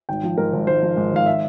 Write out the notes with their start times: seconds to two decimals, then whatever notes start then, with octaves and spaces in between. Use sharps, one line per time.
0.09 G#1 G5
0.23 F3
0.38 G#2 A#4
0.53 G#1
0.67 G#1 C5
0.82 F3
0.97 G#2
1.12 G#1 F5
1.26 E5